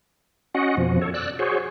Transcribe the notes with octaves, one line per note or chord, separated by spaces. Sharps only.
C#4 F#4 D#5 F#5
F2 B2 F3
A4 C#5
D5 E6 F#6
F#4 G#4 C5 C#5